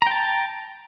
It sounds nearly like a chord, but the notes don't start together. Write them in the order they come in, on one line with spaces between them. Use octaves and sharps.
A#5 G5 A5